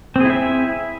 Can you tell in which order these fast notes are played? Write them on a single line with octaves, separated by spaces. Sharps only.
C4 G#4 E4 E5